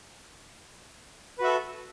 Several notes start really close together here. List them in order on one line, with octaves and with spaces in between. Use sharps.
B4 F#4 E5 A4